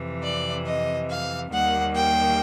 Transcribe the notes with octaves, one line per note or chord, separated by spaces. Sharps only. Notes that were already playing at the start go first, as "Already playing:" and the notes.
Already playing: F2 C3 E3
D5
D#5
F5
D#2 D#3 G3 A#3 F#5
G5